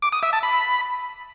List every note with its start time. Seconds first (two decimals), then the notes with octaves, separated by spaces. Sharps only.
0.02 D6
0.13 D#6
0.23 E5
0.33 A5
0.43 B5